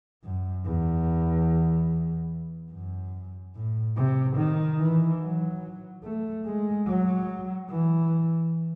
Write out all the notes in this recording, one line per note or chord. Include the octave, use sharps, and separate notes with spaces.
F#2
E2
F#2
A2
C3
D#3
E3
F#3
A3
G#3
F#3
E3